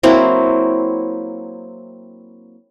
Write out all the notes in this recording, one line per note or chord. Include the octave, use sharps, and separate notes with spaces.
F#3 A#3 C4 E4